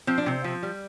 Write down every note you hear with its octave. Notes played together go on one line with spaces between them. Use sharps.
F3 C4
D4
C3 C4
F3
G3